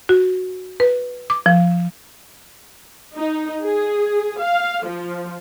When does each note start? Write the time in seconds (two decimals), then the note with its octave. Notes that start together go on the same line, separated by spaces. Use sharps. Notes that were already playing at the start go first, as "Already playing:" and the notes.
0.09 F#4
0.80 B4
1.30 D6
1.46 F3
3.14 D#4
3.62 G#4
4.38 F5
4.85 F3